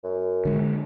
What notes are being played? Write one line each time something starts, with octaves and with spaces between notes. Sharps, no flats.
F#2
D3 G#3